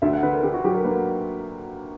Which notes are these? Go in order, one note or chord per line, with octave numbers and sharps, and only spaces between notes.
D2 E5
F#5
D3 B4
A#4
D3 G4
F#4
F#3 G4
A#4
A#3 B4